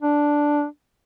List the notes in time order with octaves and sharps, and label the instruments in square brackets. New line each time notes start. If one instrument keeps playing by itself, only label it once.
[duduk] D4